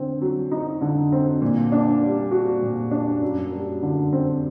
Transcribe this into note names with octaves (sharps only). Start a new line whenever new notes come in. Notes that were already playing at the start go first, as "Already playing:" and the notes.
Already playing: D3 C4
F#3
D#4
D3
C4
A#2
D4
G3
F#4
A#2
D4
F#2
G3
D3
C4